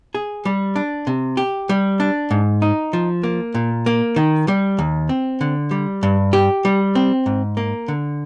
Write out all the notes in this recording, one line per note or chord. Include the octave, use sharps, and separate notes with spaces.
G#4
G3
D4
C3
G4
G3
D4
G#2
D#4
F3
A#3
A#2
A#3
D#3
G3
D#2
C4
D3
G3
G2
G4
G3
C4
G#2
A#3
D3